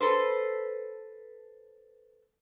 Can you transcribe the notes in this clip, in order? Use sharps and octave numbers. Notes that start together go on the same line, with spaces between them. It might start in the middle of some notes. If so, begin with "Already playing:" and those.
A4 B4 C5